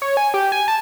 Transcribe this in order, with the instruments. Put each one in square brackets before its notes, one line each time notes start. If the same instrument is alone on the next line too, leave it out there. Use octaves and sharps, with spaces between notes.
[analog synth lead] C#5
G#5
G4
G#5
A5